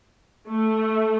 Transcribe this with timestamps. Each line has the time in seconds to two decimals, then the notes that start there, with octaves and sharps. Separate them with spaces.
0.48 A3